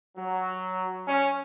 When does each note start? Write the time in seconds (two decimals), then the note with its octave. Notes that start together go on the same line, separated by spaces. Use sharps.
0.18 F#3
1.08 C#4